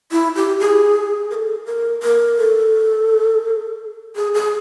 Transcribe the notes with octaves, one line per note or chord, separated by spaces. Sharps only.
E4
G4
G#4
A#4
A4
A#4
A#4
A4
G#4
G#4